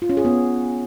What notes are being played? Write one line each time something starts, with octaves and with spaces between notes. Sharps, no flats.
F4
C#4
G#4
B3